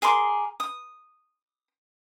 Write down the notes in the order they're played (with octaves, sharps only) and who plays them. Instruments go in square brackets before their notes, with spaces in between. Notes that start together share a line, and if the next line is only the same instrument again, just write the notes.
[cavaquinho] G#4 A#4 C6 D6
D#6